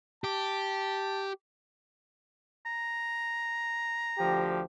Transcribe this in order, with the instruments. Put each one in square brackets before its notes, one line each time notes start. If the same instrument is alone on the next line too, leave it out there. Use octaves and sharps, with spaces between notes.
[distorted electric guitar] G4 [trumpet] A5
[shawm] A#5
[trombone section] D2 F3 G4